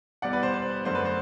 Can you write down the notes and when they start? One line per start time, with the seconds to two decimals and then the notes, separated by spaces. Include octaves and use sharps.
0.22 E2 B2 G3 B3 D5 F#5
0.33 B4 D5
0.43 C5
0.53 C5
0.85 F#2 D3 A3 D4 C5
0.95 B4
1.05 C5